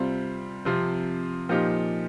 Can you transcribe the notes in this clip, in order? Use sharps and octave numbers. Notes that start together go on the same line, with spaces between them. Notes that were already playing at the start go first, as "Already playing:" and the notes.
Already playing: C3 G3 C4 F4
C3 F3 C4
A#2 F3 D#4 G4